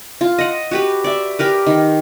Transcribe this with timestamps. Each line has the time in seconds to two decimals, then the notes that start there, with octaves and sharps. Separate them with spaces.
0.21 F4
0.39 D#5 F#5
0.71 F#4 G4 B4
1.04 D5 E5
1.39 G4 A#4 B4
1.67 D#3